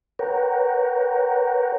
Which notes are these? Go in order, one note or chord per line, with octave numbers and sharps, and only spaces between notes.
A#4 B4 C#5 F#5 G5 A#5